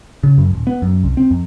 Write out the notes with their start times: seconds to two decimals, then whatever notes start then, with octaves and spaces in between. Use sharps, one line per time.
0.23 C#3
0.38 F#2
0.53 D#1
0.67 B3
0.82 F#2
1.04 C2
1.17 C4
1.31 F2